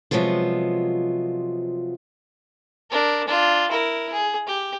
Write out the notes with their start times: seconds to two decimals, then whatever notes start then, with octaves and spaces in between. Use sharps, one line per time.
0.11 C3 F3 F#3 G#3 B3 F4
2.90 D4 A#4
3.27 D4 F4
3.70 E4 A#4
4.13 G#4
4.47 G4